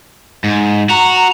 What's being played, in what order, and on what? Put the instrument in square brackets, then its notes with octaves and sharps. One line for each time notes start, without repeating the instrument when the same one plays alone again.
[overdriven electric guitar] G#2
[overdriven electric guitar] F#4 [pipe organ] A#5